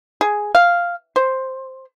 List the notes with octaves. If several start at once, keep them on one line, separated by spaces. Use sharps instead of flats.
G#4
F5
C5